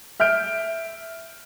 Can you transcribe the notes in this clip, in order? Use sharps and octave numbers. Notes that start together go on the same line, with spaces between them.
E5 F6 G6 D7